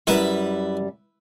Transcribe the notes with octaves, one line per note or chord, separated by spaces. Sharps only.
F#2 G3 E4 B4 E5